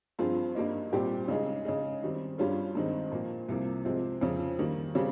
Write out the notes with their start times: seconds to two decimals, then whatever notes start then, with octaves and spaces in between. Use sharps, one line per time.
0.19 G2 F3 C4 F4 G#4
0.55 G2 G3 A#3 D#4
0.93 A#2 G3 C4 G4
1.28 C#3 G#3 D#4 G#4
1.65 C#3 G#3 D#4 G#4
2.03 D#3 G3 C4
2.38 G2 G3 C#4 F4 G#4
2.75 G2 D#3 G#3 C4 D#4
3.12 A#2 F3 A#3
3.48 C2 C3 F3 A#3
3.85 C3 F3 G#3 C4
4.21 F2 C#3 F3
4.59 D#3 G3 A#3
4.95 C#3 G3 C4